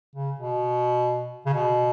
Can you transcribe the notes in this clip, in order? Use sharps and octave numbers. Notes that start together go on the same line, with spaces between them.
C#3
B2
C#3
B2